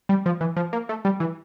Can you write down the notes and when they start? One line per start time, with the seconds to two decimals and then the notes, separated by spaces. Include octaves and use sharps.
0.09 G3
0.26 F3
0.41 E3
0.56 F3
0.73 A#3
0.89 A3
1.05 G3
1.20 E3